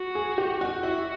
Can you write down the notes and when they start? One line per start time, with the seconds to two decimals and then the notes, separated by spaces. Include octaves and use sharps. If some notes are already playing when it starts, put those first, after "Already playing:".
Already playing: F#4
0.15 G#4
0.38 G4
0.61 F#4
0.83 E4 F#4